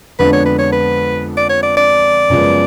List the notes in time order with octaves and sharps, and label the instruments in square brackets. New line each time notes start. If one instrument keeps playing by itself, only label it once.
[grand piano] F2 D3 G#3 B3 D4 [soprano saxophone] B4
[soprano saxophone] C#5
B4
C#5
B4
D5
C#5
D5
D5
[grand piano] F#2 C#3 F3 G#3 B3